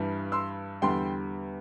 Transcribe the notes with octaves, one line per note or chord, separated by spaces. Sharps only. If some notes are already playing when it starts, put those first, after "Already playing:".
Already playing: G2 E3 G3
C6 E6
E2 D3 G3 G5 C6